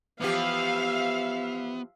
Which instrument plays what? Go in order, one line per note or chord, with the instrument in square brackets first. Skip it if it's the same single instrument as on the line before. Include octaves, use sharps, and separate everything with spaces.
[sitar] E3 F3 G4 [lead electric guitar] B3 [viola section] E5 F5